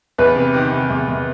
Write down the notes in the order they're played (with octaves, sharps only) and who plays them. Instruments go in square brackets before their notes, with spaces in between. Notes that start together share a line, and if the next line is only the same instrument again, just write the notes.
[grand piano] E2 [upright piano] B4
[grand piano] C3
D#3
C3
E2
E2